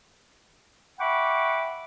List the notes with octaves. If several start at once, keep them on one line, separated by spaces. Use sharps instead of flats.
E5 F#5 G5 B5 C#6 D6